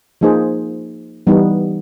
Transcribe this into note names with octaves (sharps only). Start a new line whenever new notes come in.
F3 A#3 D#4 G#4 C5
E3 G3 B3 D#4